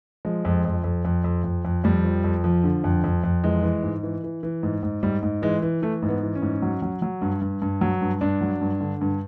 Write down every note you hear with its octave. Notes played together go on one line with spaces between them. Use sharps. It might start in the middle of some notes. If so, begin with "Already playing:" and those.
F3 G#3
F2
F2
F2
F2
F2
F2
F2
F2 G3
F3
F2
F3
D3
F2
F2
F2
E3 G#3
E3
G#2
E3
E3
E3
G#2
G#2
G#2 G3
G#2
E3 G#3
E3
E3 A3
G#2
B3
E3
C#4
G#2
F#3
F#3
F#3
G2
G2
G2
F#3
G2
G2 D4
F#3
G2
D3
G2